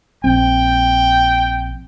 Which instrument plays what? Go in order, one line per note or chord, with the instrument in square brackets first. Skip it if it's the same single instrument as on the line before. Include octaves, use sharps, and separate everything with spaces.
[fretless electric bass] A#1 C4 [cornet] G5